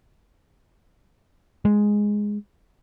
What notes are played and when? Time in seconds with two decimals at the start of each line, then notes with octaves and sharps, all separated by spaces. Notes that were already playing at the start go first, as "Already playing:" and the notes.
1.65 G#3